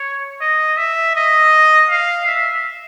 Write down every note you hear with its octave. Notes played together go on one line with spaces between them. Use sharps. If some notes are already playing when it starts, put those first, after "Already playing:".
Already playing: C#5
D#5
E5
D#5
F5
E5